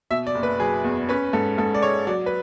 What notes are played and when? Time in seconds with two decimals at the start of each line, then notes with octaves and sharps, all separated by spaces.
0.10 B2 E5
0.27 D5
0.35 F#1
0.43 B4
0.60 F#3 G#4
0.84 E2
1.09 C#4 B4
1.33 G#2 A4
1.58 G#2 A4
1.75 D5
1.82 G#3 C#5
2.07 F#3 D5
2.26 B4